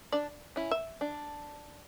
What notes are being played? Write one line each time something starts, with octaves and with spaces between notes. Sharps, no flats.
D4 D5
C#4 E4
E5
D4